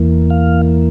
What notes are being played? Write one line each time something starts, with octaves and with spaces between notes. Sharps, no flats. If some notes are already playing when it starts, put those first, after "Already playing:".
Already playing: E2 E3 A#3
F5